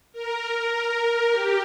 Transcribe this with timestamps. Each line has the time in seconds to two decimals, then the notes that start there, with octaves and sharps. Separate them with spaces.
0.13 A#4
0.72 A#4
1.31 G4